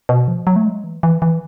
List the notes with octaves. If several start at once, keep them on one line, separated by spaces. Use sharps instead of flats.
B2
F3
F#3
A3
G#3
E3
E3
E3